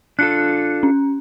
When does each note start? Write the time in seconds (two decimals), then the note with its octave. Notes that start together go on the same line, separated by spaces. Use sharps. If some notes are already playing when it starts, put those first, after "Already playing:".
0.19 D4 F4 A4 F#6 C#7
0.83 C#4